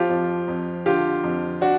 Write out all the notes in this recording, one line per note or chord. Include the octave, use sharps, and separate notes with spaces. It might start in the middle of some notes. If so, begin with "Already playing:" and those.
Already playing: F3 F4 G4
F2
F2
D3 F4 G4
F2
D4 F#4